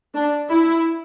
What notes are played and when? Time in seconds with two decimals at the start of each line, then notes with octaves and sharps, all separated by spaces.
0.14 D4
0.49 E4